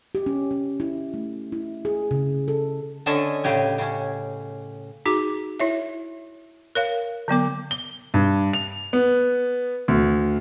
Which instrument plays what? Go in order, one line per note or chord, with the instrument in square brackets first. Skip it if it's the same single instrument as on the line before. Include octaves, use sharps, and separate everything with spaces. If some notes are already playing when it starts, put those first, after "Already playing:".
[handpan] G4
C#4
C#4
E4
A3
E4
G#4
C#3
A4
[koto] D3 C#4 A4 D#5 E5
A2 C#3 G4 G#5
C#3 C#4
[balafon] D#4 F#4 G#4 D6
E4 C#5 E5
A#4 C#5 F5
D3 F#3 B3 D6
[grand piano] G7
G2
F7
B3
D2